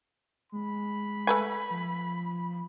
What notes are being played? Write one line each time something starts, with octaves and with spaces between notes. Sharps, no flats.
G#3 B5
A3 B4 G#5
F3